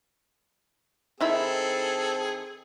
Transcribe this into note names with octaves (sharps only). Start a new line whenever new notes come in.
D#3 C4 E4 G#4 A4 B5